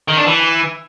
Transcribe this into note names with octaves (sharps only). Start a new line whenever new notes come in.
D#3
D4
E3